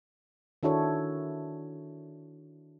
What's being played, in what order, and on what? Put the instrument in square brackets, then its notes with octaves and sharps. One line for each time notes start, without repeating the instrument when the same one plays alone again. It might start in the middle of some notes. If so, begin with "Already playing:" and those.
[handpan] D#3 D4 E4 F#4 A4 C#5